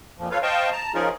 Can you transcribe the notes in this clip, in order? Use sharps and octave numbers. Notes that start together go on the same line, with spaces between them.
F2 A#2 F3
F4 A4 B4 C#5 F5
C5 D#5 F5 G5 A5 C#6
A5 A#5
F3 C#4 D#4 F4 G#4 A#4